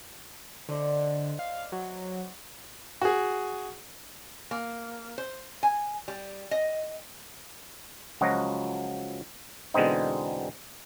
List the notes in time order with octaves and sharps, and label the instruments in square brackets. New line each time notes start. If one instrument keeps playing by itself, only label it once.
[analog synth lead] D3 [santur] C5 D5 D#5
[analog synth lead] F5
[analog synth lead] F#3 [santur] F#4
[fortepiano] F#4 G#4
[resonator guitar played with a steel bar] A#3
C5
G#5
G3
D#5
[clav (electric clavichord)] C#2 F3 F#3 F#4 D#5
E2 B2 D3 G#3 C4 D#4